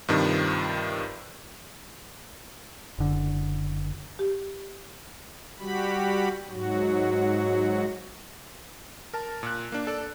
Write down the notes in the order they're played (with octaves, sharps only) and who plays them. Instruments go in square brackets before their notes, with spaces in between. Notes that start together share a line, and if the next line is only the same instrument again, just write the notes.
[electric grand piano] G2 C3 D#3 F3
[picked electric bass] F#1 D3
[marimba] G4
[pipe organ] G3 F#4 G4 B5
G#2 F#3 F#4
[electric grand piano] A#4 A5
A#2 F#6
A#3 D4
A4 D5